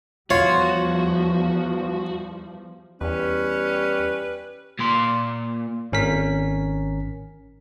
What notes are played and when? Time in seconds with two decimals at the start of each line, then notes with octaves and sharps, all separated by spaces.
0.30 E2 F3 G3 F4 F#4 C#5
3.01 E2 G3 C#4 B4
4.79 A#2 C6
5.92 G#1 C#4 A#4 B6